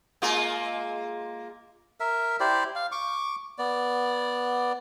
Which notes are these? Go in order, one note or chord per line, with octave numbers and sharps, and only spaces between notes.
G#3 A#3 F4
A#4 E5
E4 G4 C5 D5
F5
C#6 D6
B3 D5